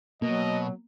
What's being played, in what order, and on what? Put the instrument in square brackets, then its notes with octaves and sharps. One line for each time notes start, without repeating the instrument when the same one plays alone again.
[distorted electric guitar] B2 [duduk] F#3 [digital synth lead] A#3 [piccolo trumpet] D#5